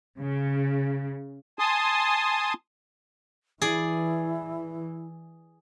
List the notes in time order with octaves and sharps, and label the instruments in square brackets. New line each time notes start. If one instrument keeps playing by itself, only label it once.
[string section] C#3
[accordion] G#5 A5 C6 D#6
[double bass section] E3 [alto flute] E4 [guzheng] G#4 D5